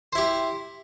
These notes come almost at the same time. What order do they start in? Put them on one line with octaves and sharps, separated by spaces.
C5 E4 G4